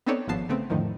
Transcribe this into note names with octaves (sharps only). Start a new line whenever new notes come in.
B3 C4 D#4 A4 C#5 D5
G#1 G#2 F3 B3 A5 C7
C#3 A3 B3 C4
F2 A2 D3 D#3 F3